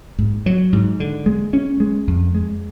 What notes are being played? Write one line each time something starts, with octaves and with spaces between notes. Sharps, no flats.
G#2
F#3
G#2
D3
G#3
C#4
G#3
F2
G#3